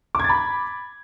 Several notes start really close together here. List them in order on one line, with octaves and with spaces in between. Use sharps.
D6 G#6 A6 B5